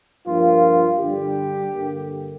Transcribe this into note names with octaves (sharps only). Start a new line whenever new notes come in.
G2 F3 A#3 F4
G2 D3 G3 G4
G2 D3 A#3